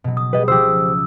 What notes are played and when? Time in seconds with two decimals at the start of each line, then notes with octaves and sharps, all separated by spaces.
0.04 B2 F#3
0.17 D#6
0.33 G3 G#3 B4 D#5
0.48 C#2 F3 G4 C5 D6 E6